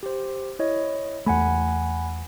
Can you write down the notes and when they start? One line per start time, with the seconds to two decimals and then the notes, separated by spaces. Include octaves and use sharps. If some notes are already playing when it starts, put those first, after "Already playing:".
0.03 G4 C5
0.59 E4 C#5 D#5
1.26 E2 A3 F#5 G#5 B5